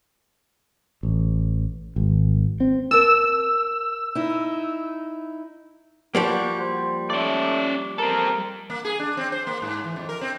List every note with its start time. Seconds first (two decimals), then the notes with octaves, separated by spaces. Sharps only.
1.03 A1
1.96 G#1
2.60 C4
2.91 A#4 A5 E6
4.15 D#4 E4
6.15 F3 G3 A#3 F#4
6.61 C5
7.10 A3 C#4 D5
7.98 C4 A4 A#4
8.70 A#3
8.85 G#4
8.99 D4
9.17 C4
9.32 C5
9.47 A#3
9.62 G#2
9.84 E3
9.96 F2
10.09 A#4
10.21 C4